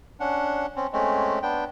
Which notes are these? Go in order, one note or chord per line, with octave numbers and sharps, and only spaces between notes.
C#4 D4 F#5
C4 C#4
G#3 A3 C4 C#4
B3 D4 G5